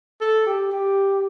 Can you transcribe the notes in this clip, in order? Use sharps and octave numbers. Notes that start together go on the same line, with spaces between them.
A4
G4
G4